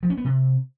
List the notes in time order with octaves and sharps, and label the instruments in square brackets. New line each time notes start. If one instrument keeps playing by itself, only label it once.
[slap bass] F3
C#4
B3
C3